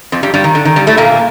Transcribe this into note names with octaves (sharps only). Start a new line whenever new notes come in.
F2 F3
G2 G3
G2 G3
D#3
D3
D#3
G2 G3
A2 A3
A#2 A#3